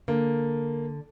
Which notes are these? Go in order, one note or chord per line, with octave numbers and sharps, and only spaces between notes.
D3 A#3